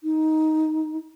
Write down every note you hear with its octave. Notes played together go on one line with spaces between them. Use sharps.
D#4